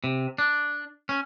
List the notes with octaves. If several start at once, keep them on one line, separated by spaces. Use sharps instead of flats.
C3
D4
C#4